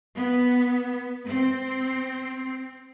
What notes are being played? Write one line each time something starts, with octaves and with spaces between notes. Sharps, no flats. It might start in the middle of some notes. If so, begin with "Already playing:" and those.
B3
C4